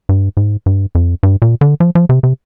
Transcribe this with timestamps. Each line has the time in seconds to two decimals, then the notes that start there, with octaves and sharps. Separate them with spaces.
0.09 G2
0.37 G#2
0.66 G2
0.95 F2
1.23 G2
1.42 A#2
1.61 D3
1.80 F3
1.95 F3
2.09 C3
2.23 C3